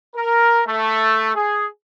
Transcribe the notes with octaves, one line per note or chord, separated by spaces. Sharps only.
A#4
A3
G#4